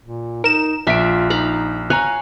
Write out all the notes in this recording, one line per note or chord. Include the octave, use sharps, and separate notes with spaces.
A#2
D#4 A#4 E7
A#1 F4 E5 F5 D7
D#4 F5 A#5 B5
C#5 F5 G#5 A#5 F#6